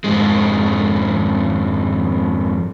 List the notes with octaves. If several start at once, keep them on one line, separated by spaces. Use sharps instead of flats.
F2 G#2 G#3